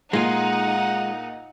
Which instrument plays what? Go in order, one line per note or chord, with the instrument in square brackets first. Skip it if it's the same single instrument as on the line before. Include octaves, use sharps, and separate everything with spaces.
[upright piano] A#2 [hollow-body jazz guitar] G#3 F4 [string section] D#4 [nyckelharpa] F#5